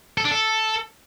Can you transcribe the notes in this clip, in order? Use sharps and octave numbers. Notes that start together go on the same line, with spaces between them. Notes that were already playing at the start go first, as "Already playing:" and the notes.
A4
D4
A4